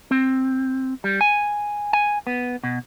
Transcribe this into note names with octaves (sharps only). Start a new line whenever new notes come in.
C4
G3
G#5
G#5
B3
B2